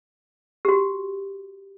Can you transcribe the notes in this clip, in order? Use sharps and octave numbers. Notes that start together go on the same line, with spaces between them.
F#4 G4